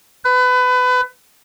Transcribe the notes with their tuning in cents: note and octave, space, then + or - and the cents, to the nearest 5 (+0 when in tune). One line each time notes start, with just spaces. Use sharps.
B4 +25